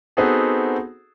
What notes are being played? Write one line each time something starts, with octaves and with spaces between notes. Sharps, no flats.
B3 C4 D#4 F#4 G#4 A4